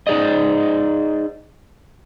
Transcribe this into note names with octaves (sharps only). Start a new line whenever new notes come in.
D#4 E4 G#4 D5 D#5